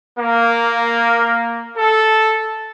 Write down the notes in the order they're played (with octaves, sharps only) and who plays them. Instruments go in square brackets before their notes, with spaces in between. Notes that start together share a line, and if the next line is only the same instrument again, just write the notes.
[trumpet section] A#3
A4